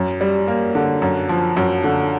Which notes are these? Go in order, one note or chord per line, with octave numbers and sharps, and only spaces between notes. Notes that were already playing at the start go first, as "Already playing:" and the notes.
Already playing: F#2
G3
A#3
D3
F#2
F3
F#2
D3